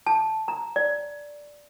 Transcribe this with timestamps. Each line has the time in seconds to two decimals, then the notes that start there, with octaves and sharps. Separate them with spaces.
0.07 A5
0.48 A#5
0.76 D5